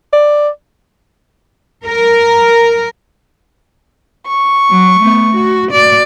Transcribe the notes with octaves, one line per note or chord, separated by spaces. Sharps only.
D5
A#4
C#6
F#3
A3 B3
F#4
F#4 D5